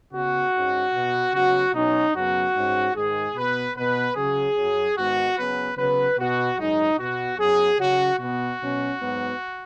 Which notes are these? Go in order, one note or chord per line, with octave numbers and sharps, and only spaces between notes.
C#3 B3 F#4
G#2 G#3 C#4
B2 B3
C#3 F#3 B3 F#4
B2 F#3 C#4 D#4
F#2 C#3 F#3 B3 F#4
G#2 G#3 C#4
G#2 D#3 G#3 G#4
B2 B3 B4
B2 B3 B4
C#3 F#3 C#4 G#4
F#2 F#3 C#4
G#2 D#3 G#3 B3 F#4
C#3 F#3 B3 B4
C#3 F#3 B3 B4
B2 B3 F#4
F#2 C#3 G#3 D#4
B2 B3 F#4
F#2 F#3 B3 G#4
C#3 F#3 C#4 F#4
B2 B3 F#4
B2 F#3 C#4
G#2 F#3 B3